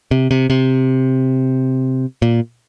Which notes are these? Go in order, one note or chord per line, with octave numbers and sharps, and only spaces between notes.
C3
C3
C3
A#2